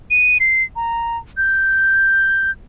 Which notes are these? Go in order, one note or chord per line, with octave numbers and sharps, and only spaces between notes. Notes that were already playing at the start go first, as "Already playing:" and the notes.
D#7
C7
A#5
G6